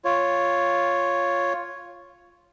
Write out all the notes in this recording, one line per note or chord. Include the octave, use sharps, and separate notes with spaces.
F4 C#5